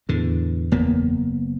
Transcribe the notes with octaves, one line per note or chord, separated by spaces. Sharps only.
E2 A2 D3
F#1 A#3 B3